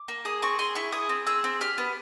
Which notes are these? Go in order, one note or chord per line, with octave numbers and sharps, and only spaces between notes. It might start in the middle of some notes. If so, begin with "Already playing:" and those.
Already playing: D6
A#3
G#4 D#6
C4 C#6
G#4 C6
E4 C#6
G#4 D#6
C4
G#4 E6
C4
G4 F6
B3